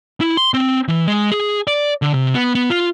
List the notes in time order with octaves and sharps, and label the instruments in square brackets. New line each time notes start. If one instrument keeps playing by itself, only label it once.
[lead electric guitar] E4
C6
C4
E3
G#3
G#4
D5
D3
C3
B3
B3
F4